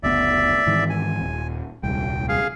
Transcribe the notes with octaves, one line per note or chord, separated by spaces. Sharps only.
F#1 D2 B3 D5 E5
G#2 D#3 E3
G#5
D#1
D#1 C2 G5
G#4 F5